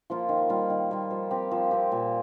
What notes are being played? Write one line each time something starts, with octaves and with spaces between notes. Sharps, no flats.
F3 A#3 F4
D#3
G3 A#3 F4
D#3
G3 A#3 F4
F3
C4 G4
F3
C4 G4
A#2